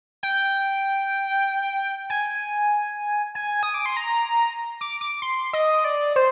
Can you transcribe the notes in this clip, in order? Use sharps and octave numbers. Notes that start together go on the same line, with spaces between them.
G5
G#5
G#5
D#6
D6
C6
A#5
D6
D6
C6
D#5
D5
C5